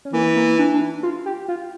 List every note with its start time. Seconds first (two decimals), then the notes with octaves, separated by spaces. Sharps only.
0.05 C#4
0.13 E3 A#3
0.36 A#3
0.59 D4
0.74 D4
0.81 E4
1.03 F4
1.26 G4
1.48 F4